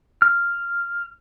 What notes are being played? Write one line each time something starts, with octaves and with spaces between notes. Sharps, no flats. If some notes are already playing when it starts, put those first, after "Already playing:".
F6